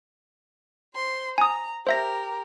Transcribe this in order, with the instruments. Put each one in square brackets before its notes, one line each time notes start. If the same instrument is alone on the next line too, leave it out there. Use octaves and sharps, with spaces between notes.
[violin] C5 C6
[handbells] G#5 D#6 [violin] A#5
[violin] G4 A#4 [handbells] C5 E5 A#6